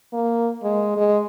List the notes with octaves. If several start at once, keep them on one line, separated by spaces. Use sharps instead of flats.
A#3
G#3
G#3